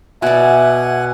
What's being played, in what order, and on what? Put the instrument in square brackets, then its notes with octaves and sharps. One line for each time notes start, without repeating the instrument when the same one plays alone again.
[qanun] B2 D5 [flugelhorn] E5 [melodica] F#5 G#5